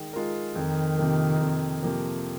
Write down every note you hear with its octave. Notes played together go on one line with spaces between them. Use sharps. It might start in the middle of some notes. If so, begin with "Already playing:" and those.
Already playing: D#3 G#3
G#3 F4 A#4
F2 D#3
C3 F3 A#3
F2
C3 F3 A#3